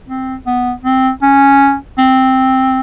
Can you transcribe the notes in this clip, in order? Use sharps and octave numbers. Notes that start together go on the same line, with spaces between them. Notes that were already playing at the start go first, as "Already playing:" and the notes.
C4
B3
C4
C#4
C4